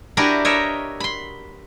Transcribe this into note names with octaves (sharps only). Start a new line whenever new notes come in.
D4 E4 F#4 G4 A#4 B4
A#4 C#5 D#5 E5
B5 C6